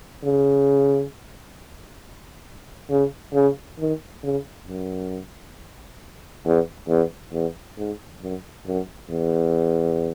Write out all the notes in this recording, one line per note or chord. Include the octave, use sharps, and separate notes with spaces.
C#3
C#3
C#3
D#3
C#3
F#2
E2
E2
E2
G#2
F#2
F#2
E2